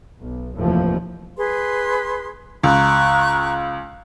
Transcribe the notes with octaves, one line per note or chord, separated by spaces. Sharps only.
B1
F1 D#2 A2 E3 F3
G#4 B4 C6
C#2 A#5 C#6 F#6